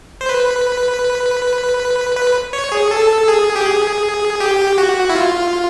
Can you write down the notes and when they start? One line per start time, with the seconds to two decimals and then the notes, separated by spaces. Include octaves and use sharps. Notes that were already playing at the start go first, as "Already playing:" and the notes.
0.21 C5
0.29 B4
2.16 B4
2.53 C#5
2.72 G#4
2.91 A4
3.28 G#4
3.56 G4
3.66 G#4
4.40 G4
4.78 F#4
5.10 E4
5.15 F4